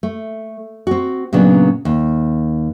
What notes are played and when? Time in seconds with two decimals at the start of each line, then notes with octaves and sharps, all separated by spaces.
0.03 A3
0.87 C4 F#4
1.33 A#2 C#3 F#3 B3 D4
1.85 D#2